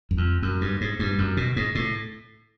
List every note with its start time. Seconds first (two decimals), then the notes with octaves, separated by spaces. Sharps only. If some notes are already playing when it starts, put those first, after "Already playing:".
0.11 F#2
0.17 F2
0.42 F#2
0.61 G2
0.81 G#2
0.99 G2
1.18 F#2
1.37 B2
1.56 G#2
1.75 A2